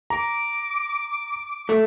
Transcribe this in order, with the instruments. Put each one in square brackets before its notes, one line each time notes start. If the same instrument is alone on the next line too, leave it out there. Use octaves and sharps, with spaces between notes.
[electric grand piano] A#5 [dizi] D6
[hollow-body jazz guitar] A3